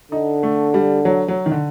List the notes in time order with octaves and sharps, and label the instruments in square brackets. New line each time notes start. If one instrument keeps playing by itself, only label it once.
[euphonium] D3 [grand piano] D#4
[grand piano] A3
G3
F#3
F#3
D#3
D3